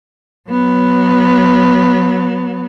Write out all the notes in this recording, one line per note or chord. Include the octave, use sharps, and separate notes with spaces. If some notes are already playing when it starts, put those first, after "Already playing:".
F#3 B3